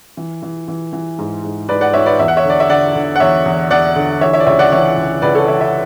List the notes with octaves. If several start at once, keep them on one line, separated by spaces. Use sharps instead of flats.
E3
E3
E3
E3
G#2
G#2
G#2 B4 D5
D5 F#5
G#2 C#5 E5
B4 D5
E2 E5
F#5
C#5 E5
D3 D5
E5
D3 D5 F#5
D3
F#5
E2 C#5 E5
E2
E2 D5 F#5
D3
E3 C#5 E5
C#5 E5
D5
C#2 C#5 E5
D5 F#5
E3 C#5 E5
C#2
C#2 B4 D5
A4 C#5
E3 C#5 E5
C#5 E5